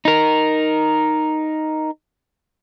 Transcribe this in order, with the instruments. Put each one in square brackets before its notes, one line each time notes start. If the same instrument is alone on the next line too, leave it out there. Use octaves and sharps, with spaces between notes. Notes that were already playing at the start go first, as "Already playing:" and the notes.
[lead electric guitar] D#4 A#4